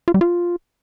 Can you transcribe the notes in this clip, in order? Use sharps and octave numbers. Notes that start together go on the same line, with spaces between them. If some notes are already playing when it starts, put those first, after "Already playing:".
F4
G3
F4